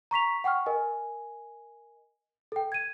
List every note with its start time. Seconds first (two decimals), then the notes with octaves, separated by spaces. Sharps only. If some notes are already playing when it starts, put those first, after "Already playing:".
0.11 A#5 C#6 B6 F7
0.44 F#5 G5 C#6 F6
0.66 A#4 D#5 G#5
2.52 A4 G5
2.72 G#6 D#7